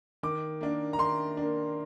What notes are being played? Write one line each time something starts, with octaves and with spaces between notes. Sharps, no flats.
D#3 D6
A#3 D4
A#5
D#3 C6
A#3 D4